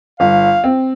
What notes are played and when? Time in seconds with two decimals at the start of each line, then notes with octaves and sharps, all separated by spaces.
0.20 G1 F5
0.64 C4